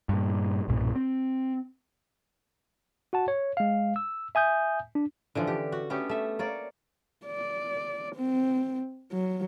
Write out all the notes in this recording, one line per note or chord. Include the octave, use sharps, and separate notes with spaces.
G2 A#2
B1 G2 A#2
C4
F#4 F#5 A5
C#5
G#3 F5
E6
E5 G#5 D#6 G6
D4
D3 E3 F3 C#4
G4
F#4
A3 B3 C#4 G4
A3 E5
A#3 C#5 D5
D5
C4
F#3